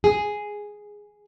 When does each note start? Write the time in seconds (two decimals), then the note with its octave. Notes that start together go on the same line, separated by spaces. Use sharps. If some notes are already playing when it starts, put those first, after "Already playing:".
0.04 G#4